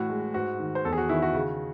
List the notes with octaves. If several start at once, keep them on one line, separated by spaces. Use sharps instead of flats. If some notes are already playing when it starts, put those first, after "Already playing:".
Already playing: A2 E3 F#4
G#3
G#2 F#4
D#3
C5
E2 A4
G#4
F#4
D#3 E4
F#4
C#3